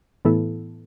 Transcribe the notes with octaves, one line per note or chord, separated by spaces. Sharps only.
A2 E3 B3 E4 A4